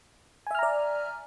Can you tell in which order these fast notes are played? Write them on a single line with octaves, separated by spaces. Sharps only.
G#5 E5 F6 A#5 D5